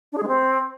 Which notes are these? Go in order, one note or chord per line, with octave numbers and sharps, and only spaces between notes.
D4
G#4
G#3
C4